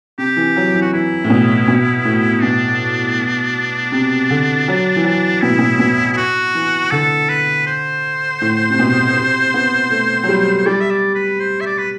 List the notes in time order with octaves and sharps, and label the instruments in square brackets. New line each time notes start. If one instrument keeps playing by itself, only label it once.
[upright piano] C3 [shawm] G4
[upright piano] E3
F#3
E3
[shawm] F#4
[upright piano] E3 [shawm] E4
[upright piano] A2
B2
B2
A2
[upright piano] B2 [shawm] D4
[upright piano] C3
D3
F#3
E3
F#3
[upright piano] B2 [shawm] E4
[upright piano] A2
B2
B2
[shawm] E4
F#4
[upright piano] E3
[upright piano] D3 [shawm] A4
[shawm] B4
C5
[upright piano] A2
C3
B2
C3
B3
A3
F#3
G3
[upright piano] G3 [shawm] D5
[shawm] E5
D5
B4
C5
E5
D5
B4